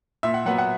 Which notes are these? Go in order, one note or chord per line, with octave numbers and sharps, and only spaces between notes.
A#2 E5
F#5
F#3 B3 F#5
F#5